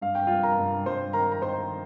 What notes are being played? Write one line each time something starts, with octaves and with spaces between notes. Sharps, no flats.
G2 F5
G5
G2 F4 F5
A#4 A#5
G2
G2 C5 C6
D#3 A#4 A#5
A#5
D#3 C5 C6